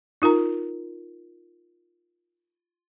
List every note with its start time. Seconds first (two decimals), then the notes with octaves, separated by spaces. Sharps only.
0.22 D#4 F4 A#4 A#5